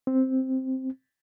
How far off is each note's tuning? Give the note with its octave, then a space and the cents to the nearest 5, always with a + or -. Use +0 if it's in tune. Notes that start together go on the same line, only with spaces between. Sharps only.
C4 +0